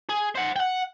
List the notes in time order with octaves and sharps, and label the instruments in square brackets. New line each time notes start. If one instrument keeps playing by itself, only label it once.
[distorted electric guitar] G#4
C5 F#5
F#5 G5